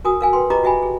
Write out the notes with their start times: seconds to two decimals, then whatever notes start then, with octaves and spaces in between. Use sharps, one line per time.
0.05 F#4 A#4 G#5 D#6
0.21 A#4 F5 G#5
0.33 B4 G5 C6
0.50 F4 G4 B4 D#5 A#5 D6
0.63 F#4 G4 E5 G5 G#5 B5
0.83 G#4